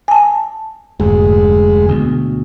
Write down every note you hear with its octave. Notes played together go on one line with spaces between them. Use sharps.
G#5 A5
F1 D2 G#2 G#3
D2 B2